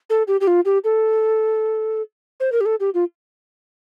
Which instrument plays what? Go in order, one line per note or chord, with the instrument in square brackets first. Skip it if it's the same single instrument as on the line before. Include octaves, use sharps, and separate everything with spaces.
[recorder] A4
G4
G4
F4
G4
A4
C5
A#4
G4
A4
G4
F4